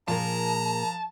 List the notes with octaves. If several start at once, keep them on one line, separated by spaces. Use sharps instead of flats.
A#2 F3 G#4 A#4 A5 A#5